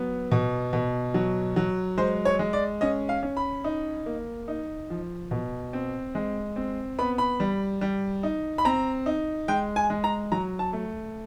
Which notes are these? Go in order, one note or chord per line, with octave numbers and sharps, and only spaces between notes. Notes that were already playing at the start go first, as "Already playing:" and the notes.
Already playing: F#3 B3
B2
B2
F#3
F#3
G#3 C5
C#5
G#3
D5
C#4 D#5
F5
C#4
B5
D#4
A#3
D#4
F3
B2
C4
G#3
C4
B3 B5
B5
G3
G3
D#4
B5
C4 A#5
D#4
G#3 G5
G#5
G#3
A#5
F#3 A#5
A5
A3